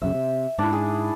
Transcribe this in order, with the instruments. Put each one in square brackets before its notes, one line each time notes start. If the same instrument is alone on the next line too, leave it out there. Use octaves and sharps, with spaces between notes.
[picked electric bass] B1 F#2 C#3 [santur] E5
[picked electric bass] C3
[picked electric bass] G#2 [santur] D4 E4
[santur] G#4